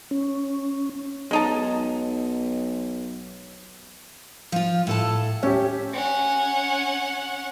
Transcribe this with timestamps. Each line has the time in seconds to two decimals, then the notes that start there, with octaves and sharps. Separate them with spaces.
0.11 C#4
1.31 B1 G#3 D#4 A5
4.52 F3 F4
4.87 A2 A4 A5
5.43 A3 C#4 G4
5.94 C#4 F#5